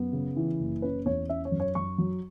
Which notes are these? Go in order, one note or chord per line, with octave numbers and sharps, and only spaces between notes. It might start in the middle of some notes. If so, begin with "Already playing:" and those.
Already playing: F#2 B3
C#3
E3
F#1
C#4 B4
E2 C#5
C#4 E5
C#5
F#2
C#5
F#2 C#6
F#3